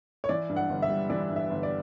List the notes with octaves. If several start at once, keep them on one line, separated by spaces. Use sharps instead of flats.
C#5
E3 D5
G2
F#5
G1
E5
G3
E3 D5
G2
E5
G1
D5